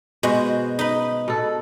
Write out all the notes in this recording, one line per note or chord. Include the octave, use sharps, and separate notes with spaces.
B2 G#3 F#4 C5
D#4 B4
B2 A4